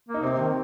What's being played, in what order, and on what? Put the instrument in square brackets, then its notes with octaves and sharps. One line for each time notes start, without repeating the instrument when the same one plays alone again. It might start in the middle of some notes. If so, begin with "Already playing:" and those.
[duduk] A#3
[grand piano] D#4
[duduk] C3 [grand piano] C4
[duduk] D#3